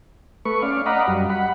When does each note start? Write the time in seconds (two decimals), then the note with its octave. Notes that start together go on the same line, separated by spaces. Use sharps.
0.45 A3 B4 C#6
0.62 C#4 D5 F5
0.86 D5 D#5 F5 F#5 A#5 B5
1.08 F#2 G3
1.30 F#5 B5